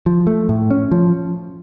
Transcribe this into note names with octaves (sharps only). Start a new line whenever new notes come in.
F3
A3
A2
C#4
F3